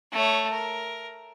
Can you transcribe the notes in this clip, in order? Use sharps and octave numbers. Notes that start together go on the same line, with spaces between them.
A3 C#5
A#4